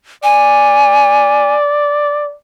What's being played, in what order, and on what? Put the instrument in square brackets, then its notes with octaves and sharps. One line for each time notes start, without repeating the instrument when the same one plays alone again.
[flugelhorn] D5 [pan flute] G#5